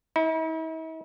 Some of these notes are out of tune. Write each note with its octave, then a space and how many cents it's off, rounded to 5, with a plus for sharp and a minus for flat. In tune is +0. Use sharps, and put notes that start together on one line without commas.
E4 -45